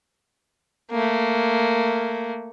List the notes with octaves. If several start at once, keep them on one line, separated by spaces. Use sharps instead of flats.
A3 A#3